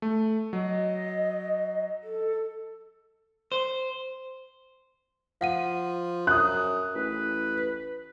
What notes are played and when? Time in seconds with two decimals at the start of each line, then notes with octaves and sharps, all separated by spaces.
0.02 A3
0.53 F#3 D#5
2.03 A4
3.52 C5
5.41 F3 F5 F#5 D#7
6.27 F#2 D#6 F#6
6.95 A1 B4